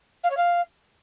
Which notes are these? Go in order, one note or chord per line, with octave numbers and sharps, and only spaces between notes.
F5
C#5
F5